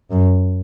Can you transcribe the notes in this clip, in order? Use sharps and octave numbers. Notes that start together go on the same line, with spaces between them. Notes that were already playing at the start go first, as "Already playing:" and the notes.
F#2